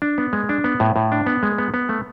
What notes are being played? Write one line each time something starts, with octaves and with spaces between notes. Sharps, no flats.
D4
B3
G#3
D4
B3
A2
A2
D4
B3
G#3
B3
B3
A3